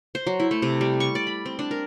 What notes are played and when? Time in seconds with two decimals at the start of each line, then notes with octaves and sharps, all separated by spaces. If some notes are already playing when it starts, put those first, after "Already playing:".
0.15 C5
0.27 F#3
0.40 E4
0.51 A3
0.62 C3
0.81 G3
1.00 C#6
1.15 D5
1.27 B5
1.46 C4
1.59 D4
1.71 A#4